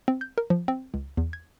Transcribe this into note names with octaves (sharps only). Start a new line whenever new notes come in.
C4
G6
A#4
F3
C4
C#2
E2
G#6